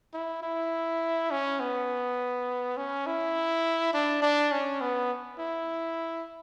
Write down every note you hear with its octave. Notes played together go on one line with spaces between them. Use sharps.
E4
E4
C#4
B3
C#4
E4
D4
D4
C#4
B3
E4